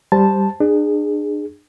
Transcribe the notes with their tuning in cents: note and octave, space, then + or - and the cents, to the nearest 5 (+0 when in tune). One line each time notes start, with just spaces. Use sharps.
G3 +0 C5 +0 A5 +0
D4 +35 G#4 -10